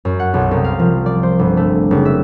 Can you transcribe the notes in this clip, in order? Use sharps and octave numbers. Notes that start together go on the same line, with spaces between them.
F#2
F#5
B1
C2
F5
F3
D5
C5
G1
A3
F#1
E5